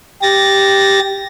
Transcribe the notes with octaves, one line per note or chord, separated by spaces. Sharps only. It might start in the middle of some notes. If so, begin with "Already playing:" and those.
G4 A6 A#6